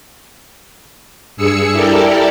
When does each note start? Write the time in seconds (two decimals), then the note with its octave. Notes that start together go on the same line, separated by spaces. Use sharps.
1.37 G2 G#4 E6 C#7
1.73 E4 G4 A4 A#4 D5